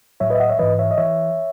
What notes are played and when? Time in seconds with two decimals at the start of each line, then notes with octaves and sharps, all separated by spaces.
0.20 A2 F#3 C#5 E5
0.30 B4 D#5
0.35 E5
0.40 D#5 F#5
0.49 C#5 E5
0.59 G#2 E3 B4 D#5
0.79 C#5 E5
0.91 D#5
0.98 E3 C#5 E5